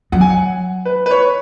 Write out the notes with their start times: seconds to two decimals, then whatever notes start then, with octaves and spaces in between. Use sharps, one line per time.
0.12 F#3 F#5
0.21 G#5
0.30 F#5
0.85 B4
1.06 B4
1.11 C#5